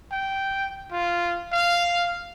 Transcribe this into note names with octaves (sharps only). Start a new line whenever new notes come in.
G5
F4
F5